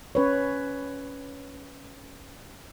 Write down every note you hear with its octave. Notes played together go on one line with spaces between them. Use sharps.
C#4 B4 C#5